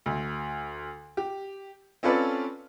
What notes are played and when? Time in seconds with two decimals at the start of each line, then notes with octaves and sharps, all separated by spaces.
0.06 D2
1.17 G4
2.03 C4 C#4 F4 A4 B4 D5